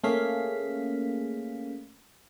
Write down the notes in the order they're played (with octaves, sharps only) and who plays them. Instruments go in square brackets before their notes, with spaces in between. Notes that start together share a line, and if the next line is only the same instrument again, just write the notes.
[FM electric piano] A3 A#3 C#4 G#4 F5 B6